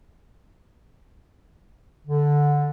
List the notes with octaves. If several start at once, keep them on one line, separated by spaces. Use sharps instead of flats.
D3